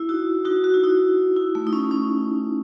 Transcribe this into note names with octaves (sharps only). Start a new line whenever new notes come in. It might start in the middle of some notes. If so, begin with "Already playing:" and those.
Already playing: E4
D#4 F#4
D#4 F#4
F#4
E4
D#4 F#4
E4
A3
D#4
C#4
C#4